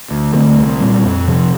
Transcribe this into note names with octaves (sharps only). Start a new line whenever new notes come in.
D2
D3 A3 C4
C2
A#2 G3 C4
F2
C3 F3 C4